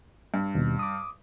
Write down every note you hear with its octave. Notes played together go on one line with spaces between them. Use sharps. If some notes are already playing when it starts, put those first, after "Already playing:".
G2
D#2 B2
D6 D#6